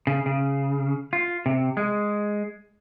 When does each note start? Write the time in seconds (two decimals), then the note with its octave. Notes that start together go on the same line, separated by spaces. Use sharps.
0.07 C#3
0.26 C#3
1.13 F4
1.46 C3
1.77 G#3